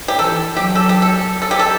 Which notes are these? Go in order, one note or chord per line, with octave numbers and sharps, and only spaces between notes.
G4
E3 A4
F#3 G4
A4
G4
A4
A4
G4
A4